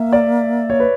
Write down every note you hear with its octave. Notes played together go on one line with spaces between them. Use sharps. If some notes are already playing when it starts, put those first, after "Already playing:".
Already playing: A#3 E5
D5
C#5
B4